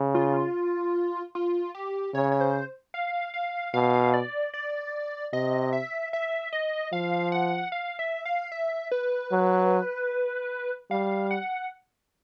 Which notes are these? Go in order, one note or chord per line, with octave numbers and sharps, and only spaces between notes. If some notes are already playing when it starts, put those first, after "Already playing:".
Already playing: C#3
F4
F4
G4
C#3 C#5
C#5
C5
F5
F5
B2 F5
D5
D5
C3 D#5
E5
E5
D#5
F3 F5
F#5
F5
E5
F5
E5
B4
F#3
G3 F5
F#5